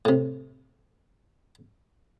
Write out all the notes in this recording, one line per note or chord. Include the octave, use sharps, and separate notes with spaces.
A2 C3